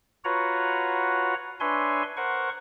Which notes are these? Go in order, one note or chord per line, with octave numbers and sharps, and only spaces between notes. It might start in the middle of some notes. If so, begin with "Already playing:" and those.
F4 F#4 B4 C#5 F#5 A#5
D4 B4 C#5 E5 G#5 C6
A#4 C5 F#5 C#6